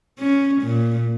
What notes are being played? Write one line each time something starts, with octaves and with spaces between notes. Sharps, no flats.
C#4
A#2